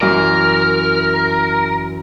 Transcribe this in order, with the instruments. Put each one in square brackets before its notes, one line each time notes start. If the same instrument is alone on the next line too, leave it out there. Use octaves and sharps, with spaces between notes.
[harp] F#2 E3 D5 [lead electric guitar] A#4 [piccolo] F6